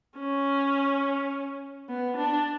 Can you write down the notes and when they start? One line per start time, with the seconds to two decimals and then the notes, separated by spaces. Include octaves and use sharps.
0.19 C#4
1.89 B3
2.17 D4